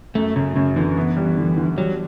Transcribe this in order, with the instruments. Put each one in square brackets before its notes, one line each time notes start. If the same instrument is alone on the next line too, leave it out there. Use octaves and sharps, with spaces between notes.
[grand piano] F#2 [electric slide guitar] A3
[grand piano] F#2 [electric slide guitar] C#3
[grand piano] F#2 [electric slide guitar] C#3
[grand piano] D3 [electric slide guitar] E3
[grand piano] B3
G3
D3
D3
[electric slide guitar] F#3 [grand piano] G3